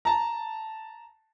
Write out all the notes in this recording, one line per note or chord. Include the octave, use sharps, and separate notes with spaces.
A5 A#5